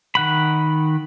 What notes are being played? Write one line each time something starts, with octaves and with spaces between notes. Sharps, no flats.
D#3 F#5 B5